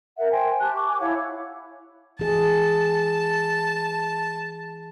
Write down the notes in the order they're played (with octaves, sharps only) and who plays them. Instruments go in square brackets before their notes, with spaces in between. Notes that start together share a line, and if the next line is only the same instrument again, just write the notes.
[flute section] A#4 E5 F#5
C5 G5 G#5
G4 A5 F#6
C#6 D6
G#5 D6
E4 C#5 F5 F#5
[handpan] E3 G#4 [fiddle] A5